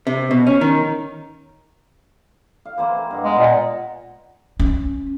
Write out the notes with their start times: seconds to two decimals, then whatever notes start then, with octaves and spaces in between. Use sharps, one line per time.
0.07 C3
0.31 B2
0.47 C#4
0.61 D#3
2.65 F5
2.78 E3 A#3 C4
2.96 A#3
3.11 G2 D#5 F#5
3.24 G#3 B3 A#5
3.39 A#2
4.60 C#4